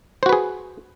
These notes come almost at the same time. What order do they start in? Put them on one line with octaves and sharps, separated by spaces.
C5 F#4 B4 G#4